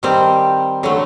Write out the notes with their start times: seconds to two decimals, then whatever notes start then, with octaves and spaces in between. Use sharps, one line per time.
0.03 D#3 G3 C4
0.83 D3 F#3 A3